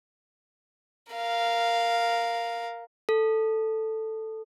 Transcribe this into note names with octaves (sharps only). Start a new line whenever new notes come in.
A#4 F5
A4